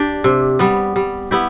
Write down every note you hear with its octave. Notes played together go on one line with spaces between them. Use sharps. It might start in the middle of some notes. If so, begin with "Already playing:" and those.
Already playing: D4 G4
C3
G3 B3
G3
B3 E4 G4